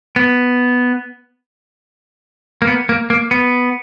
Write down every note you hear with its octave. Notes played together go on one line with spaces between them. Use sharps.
B3
A#3
B3
A#3
A#3
B3